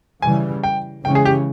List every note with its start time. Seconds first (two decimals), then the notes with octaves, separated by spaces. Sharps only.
0.22 C#3 E3 G3 G#5
0.64 G5
1.04 C#3 E3 G#3 C#4 G5
1.15 G#4
1.25 G4